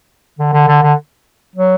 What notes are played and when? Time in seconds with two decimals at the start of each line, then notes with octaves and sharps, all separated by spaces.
0.39 D3
0.53 D3
0.68 D3
0.83 D3
1.56 F#3